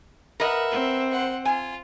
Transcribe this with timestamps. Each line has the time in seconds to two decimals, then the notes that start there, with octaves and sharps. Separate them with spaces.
0.40 A#4 B4 D#5 E5 F#5
0.70 C4
1.11 C5 F#5
1.45 F4 G#5